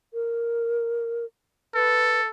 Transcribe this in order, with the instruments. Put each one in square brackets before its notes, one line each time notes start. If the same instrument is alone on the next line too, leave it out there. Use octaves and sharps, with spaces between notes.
[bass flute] A#4
[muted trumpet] A4 [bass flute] B4